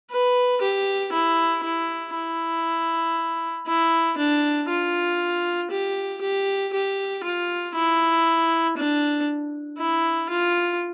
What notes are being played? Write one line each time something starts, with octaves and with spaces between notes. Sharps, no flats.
B4
G4
E4
E4
E4
E4
D4
F4
G4
G4
G4
F4
E4
D4
E4
F4